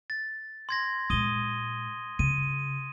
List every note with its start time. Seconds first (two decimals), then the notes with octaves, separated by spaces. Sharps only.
0.10 A6
0.69 C6 G#6 A#6
1.10 A#2 G#3 D#6 D#7 G7
2.19 C#3 D#7